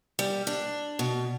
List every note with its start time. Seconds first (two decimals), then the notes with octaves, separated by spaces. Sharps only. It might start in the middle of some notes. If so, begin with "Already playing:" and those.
0.19 G3
0.47 D4
0.99 B2